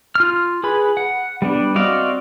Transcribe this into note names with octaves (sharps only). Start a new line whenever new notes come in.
F4 F6
G#4 B4 B5
F#5
G3 B3 D4
C4 F#4 D5 D#5 F5